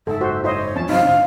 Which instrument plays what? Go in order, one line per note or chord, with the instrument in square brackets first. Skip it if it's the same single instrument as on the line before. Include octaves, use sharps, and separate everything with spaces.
[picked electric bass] F#1 G#2 [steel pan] A4 [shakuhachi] E5
[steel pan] F#4 C5
[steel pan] E4 C5 D#5 [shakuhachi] C#5
[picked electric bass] E2 F3 [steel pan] C#4 A5
[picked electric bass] C2 G2 F#3 [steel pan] C4 D#4 [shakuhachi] F5
[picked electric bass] G#2 D3 D4